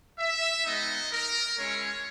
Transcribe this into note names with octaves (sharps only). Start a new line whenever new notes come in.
E5
G#3 B3 D#4 D#5
A#4
G#3 C#4 E4 C#5